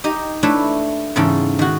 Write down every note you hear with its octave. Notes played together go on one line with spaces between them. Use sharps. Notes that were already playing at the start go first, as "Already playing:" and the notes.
D#4 G4 D#5
A3 D4 E4 B4 C#5
E2 G#2 C#3 A4 G5
D#3 F#4